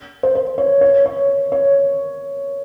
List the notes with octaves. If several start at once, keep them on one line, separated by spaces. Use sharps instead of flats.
C5
C5
C#5
C#5
C#5
C#5